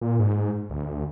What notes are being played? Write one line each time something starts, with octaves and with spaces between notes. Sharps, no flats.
A#2
G#2
D2